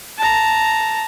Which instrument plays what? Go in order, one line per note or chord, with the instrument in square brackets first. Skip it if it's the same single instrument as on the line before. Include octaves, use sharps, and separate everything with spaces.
[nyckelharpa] A5 A#5